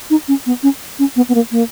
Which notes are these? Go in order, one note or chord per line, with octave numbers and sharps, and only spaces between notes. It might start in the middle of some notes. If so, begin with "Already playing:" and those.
D#4
C#4
B3
C#4
C#4
B3
B3
A#3
A#3